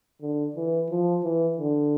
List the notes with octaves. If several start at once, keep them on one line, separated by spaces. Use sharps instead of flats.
D3
E3
F3
E3
D3